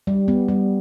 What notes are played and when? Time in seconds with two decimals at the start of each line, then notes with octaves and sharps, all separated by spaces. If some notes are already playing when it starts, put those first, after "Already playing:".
0.07 G3
0.28 B3
0.48 G3